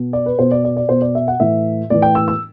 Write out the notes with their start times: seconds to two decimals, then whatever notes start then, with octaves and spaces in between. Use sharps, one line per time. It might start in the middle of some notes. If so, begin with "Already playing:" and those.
Already playing: B2
0.13 D5
0.26 B4
0.39 B2 C5
0.51 D5
0.65 D5
0.77 D5
0.89 B2 C5
1.02 D5
1.15 E5
1.28 F#5
1.40 A2 E3 E5
1.90 A2 E3 D5
2.02 G5
2.15 E6
2.28 E6